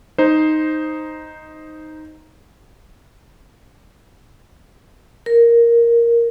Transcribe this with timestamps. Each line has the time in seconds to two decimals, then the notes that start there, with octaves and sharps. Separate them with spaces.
0.18 D#4 C5
5.26 A#4